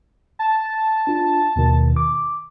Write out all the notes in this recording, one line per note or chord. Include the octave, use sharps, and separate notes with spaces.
A5
D4 F4
D#2 B2 D#3
D6